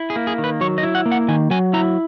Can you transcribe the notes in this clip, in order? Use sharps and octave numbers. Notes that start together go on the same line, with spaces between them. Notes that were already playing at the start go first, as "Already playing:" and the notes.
Already playing: E4
G#4
A#3
G#4
D#3
B4
F#3 C#5
D#5
E4
F#5
A#3
F#5
D#3 G#5
F#3 G#5
E4 A#5